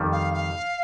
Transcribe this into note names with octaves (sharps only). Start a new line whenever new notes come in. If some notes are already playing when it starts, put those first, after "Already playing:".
Already playing: F2 D#3 G3
F5
F5